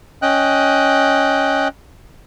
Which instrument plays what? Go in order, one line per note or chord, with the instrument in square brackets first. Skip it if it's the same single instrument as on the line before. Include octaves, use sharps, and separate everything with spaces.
[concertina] C#4 D#5 G5 F#6